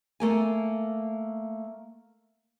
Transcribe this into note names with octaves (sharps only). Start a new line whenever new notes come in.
A3 A#3 G#5